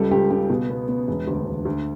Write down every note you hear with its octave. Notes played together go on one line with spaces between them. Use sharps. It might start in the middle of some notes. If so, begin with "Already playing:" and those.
Already playing: C#2 G3 A4
C#2 G4
C#3 G4
B2
B3
B3
E1
D2
E1
D2